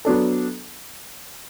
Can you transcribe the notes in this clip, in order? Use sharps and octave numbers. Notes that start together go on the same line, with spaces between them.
F#3 B3 D4 A4